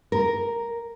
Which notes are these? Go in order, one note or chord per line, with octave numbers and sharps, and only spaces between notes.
A#4